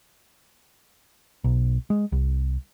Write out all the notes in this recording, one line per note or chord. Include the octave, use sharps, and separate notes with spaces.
B1
G#3
C2